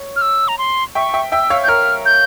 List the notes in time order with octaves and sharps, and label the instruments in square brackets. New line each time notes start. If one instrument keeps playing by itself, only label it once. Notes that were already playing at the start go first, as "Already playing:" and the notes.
Already playing: [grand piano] C#5
[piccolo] F6
E6
A#5
C6
[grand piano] E5 G5 [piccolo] C#6
[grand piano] E5 G5
[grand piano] E5 G5 [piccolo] E6
[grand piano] C#5 F5
[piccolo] G6
[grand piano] A#4 C#5 [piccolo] F6
[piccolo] G6